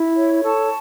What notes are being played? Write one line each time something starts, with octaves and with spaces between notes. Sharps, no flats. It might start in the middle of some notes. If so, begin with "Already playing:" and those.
Already playing: E4
C#5
A4 A5 C#6